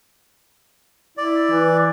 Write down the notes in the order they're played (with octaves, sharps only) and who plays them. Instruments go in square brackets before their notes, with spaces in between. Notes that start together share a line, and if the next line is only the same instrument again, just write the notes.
[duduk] E4 [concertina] D5
[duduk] E3